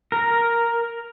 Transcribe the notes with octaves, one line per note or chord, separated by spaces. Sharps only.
A#4